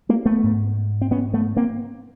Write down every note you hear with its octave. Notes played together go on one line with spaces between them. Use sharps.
G#3 A#3
A3 B3
G#2
C4
B3 C#4
A3 B3
A#3 C4